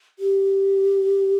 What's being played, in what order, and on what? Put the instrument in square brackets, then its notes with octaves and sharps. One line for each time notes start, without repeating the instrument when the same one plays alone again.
[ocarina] G4